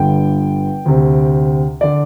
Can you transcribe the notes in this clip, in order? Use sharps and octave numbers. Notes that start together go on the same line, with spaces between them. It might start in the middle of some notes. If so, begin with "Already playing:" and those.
Already playing: G1 G2 D3 G5
D2 C3
D3 D5